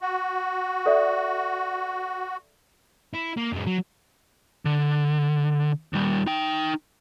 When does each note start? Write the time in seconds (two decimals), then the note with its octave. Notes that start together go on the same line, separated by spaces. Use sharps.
0.01 F#4
0.86 A4 D5 E5
3.14 E4
3.37 A#3
3.53 F#2 G#3
3.67 F#3
4.65 D3
5.93 D#2 G3
6.27 D#4 G5